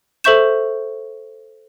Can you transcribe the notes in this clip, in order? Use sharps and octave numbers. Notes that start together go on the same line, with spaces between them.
A4 C5 E5 C#6 G6 E7